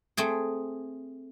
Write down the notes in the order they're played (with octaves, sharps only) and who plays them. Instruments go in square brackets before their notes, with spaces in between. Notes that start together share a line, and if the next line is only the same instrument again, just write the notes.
[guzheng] A3 C4 G#4